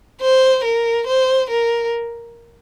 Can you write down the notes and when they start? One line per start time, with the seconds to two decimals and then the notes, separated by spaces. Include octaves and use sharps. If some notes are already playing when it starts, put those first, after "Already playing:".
0.21 C5
0.64 A#4
1.07 C5
1.50 A#4